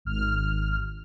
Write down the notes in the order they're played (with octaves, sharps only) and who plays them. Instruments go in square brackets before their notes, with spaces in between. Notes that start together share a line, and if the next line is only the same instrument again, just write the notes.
[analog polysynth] G#1 F6